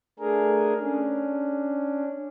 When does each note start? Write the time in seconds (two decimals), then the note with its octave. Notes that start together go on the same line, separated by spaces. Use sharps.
0.19 A3 D4 G#4 A#4
0.79 C#4 D4